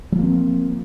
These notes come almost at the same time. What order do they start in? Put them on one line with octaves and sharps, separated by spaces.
F#3 F3 A#3 C4